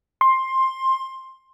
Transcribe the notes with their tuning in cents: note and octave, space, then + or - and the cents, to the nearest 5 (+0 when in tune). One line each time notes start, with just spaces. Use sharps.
C6 +15